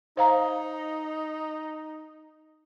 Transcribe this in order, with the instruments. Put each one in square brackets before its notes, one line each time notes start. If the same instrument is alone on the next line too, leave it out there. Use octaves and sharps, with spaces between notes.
[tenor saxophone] D#4 [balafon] C5 F5 A#5